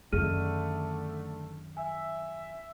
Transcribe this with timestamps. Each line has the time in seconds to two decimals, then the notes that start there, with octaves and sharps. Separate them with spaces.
0.13 F#2 D3 D#3 A3 G#4 F6 D#7
1.77 E5 G#5